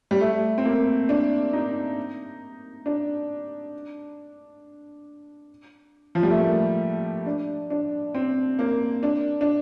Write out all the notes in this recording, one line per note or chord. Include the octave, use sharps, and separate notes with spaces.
G3
A3
C4
A#3
D4
D#4
D4
F3
G3
A3
A#3
D4
D4
C4
A#3
D4
D4